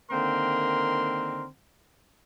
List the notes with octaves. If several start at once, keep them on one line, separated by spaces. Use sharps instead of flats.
D3 D#3 A#3 C4 A#4 C6